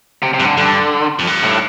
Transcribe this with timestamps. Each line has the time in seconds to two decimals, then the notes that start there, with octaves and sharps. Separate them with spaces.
0.23 C3
0.34 C3
0.39 G2
0.45 D3
0.57 G2 D3
1.19 F2
1.27 G2
1.44 A2